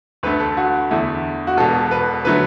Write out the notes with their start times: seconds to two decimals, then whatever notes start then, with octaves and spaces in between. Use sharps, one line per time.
0.23 D2 D3 A3 B4
0.40 A4
0.57 F#4
0.91 E2 D3 A3 E4
1.47 F#4
1.57 E1 E2 B2 A4
1.91 B4
2.25 D3 F#3 A3 B4